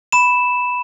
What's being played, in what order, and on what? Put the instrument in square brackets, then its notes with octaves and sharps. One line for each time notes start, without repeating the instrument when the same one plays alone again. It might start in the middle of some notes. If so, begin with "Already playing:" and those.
[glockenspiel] B5 E7